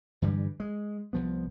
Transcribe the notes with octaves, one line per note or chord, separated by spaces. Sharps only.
G2 D3 E3 G3
G#3
C2 F3 B3